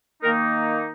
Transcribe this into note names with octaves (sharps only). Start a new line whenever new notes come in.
D#3 A#3 D#4 A#4